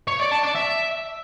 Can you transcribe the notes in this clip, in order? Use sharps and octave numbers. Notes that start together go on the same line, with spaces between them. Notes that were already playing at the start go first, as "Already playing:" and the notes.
C#5
D5
A5
D5
E5